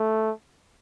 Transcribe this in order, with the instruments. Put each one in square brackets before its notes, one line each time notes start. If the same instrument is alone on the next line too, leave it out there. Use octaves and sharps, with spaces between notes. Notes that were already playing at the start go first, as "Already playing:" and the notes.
Already playing: [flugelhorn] A3